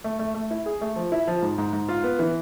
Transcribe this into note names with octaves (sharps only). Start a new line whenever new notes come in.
A3
A3
A3
E4
G#4
A3
F3
E4
F3
G#2
G#2
G#2
F4
B3
E3